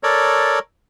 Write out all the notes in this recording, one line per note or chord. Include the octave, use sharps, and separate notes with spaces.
A4 A#4 C#5 D5